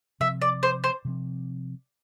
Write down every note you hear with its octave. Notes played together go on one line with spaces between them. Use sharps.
C3 F3 C4 E5
D5
C5
C5
C3 F3 C4